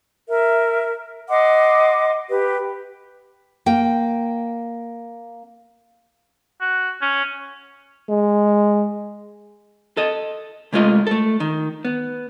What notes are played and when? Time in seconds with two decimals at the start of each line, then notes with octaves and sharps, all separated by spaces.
0.28 A#4 E5
1.29 D#5 F#5 C6 D6
2.29 G4 B4
3.66 A#3 G5
6.61 F#4
7.01 C#4
8.09 G#3
9.97 A4 D#5
10.73 C3 G#3 A3 F4 D#5
11.07 A3 A4
11.40 D#3
11.85 B3